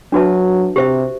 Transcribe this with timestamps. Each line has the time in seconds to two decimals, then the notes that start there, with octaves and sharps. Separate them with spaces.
0.12 F#3 D4 F#4 B4 E5 A5
0.76 C3 G4 C5 E5